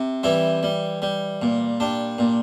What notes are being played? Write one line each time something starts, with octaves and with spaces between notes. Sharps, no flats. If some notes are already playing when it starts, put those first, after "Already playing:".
Already playing: C3
E3 G3 E4
G3
G3
A#2
G3 D4
A#2